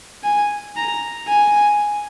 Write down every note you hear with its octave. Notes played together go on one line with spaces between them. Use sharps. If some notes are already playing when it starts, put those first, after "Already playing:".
G#5
A#5
G#5